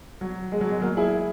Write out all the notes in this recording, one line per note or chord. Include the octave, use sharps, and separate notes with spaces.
F#3
G#3
F#3
G#3
F#3 A#3
E4 G#4